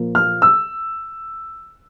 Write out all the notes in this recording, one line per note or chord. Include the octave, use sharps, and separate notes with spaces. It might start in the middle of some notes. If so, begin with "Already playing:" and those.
Already playing: A#2 F3 A#3
F6
E6